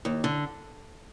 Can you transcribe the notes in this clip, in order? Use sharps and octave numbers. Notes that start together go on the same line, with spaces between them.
D#2
D3